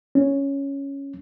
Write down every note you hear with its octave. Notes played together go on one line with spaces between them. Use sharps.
C#4